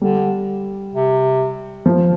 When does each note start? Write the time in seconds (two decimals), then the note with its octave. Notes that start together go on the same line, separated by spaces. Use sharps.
0.02 D3 G3
0.94 C3
1.86 F3